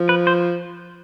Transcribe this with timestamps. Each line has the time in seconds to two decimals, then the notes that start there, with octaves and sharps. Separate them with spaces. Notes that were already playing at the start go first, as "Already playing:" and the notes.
Already playing: F3
0.09 B4
0.27 C5